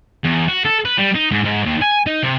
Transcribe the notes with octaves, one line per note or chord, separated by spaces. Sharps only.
E2
F#4
A4
B4
G3
D#4
G#2
G#2
D#2
G#5
D#4
C3